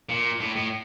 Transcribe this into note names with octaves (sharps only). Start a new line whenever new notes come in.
A#2
A2
A2